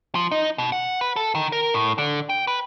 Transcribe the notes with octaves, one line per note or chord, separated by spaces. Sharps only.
F3
D#4
B2
F#5
B4
A4
D#3
A#4
A2
D3
G5
B4